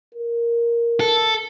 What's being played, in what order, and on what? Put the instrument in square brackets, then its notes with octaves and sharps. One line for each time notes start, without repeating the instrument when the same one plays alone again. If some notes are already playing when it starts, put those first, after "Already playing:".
[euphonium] A#4
[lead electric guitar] A4